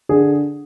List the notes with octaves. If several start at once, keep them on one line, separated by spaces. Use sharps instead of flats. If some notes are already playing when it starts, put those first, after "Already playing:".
D3 G#4